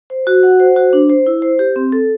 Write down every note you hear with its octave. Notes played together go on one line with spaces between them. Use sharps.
C5
F#4
F#5
C5
F#4
D4
C5
E4
C5
G4
C4
A4